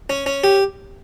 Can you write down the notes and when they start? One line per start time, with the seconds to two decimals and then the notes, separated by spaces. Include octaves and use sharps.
0.10 C#4
0.26 C#4
0.44 G4